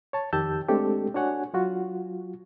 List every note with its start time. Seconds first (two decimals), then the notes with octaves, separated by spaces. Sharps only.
0.13 C#5 A5
0.33 F2 D#3 G4 A5 E6 G6
0.68 G#3 A3 C4 D4 G4 A4
1.14 D4 F#4 C#5 F#5 G#5
1.54 F#3 F4 F#4